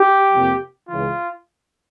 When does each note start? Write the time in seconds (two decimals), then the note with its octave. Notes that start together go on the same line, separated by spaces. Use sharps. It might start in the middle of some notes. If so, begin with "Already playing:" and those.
Already playing: G4
0.33 F2 C3 F3 A#3
0.88 C#2 C#3 E3 F4